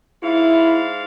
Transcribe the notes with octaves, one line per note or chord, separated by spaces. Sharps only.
G#2 E4 F5